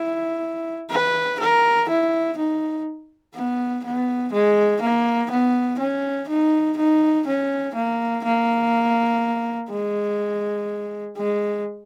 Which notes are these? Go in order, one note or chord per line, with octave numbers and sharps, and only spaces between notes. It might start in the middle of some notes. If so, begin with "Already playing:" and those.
Already playing: E4
B4
A#4
E4
D#4
B3
B3
G#3
A#3
B3
C#4
D#4
D#4
C#4
A#3
A#3
G#3
G#3